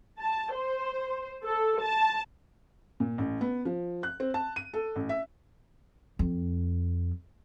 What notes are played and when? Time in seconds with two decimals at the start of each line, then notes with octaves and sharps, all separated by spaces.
0.20 A5
0.54 C5
1.45 A4
1.81 A5
3.00 A#2
3.18 A1
3.41 B3
3.65 F3
4.03 F#6
4.20 C4
4.34 A5
4.56 D#7
4.74 A4
4.96 A1
5.09 E5
6.19 F2